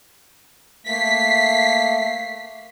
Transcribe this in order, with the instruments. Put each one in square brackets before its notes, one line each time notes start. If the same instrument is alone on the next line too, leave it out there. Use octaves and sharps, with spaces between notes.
[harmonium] A3 A#3 [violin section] B6 C7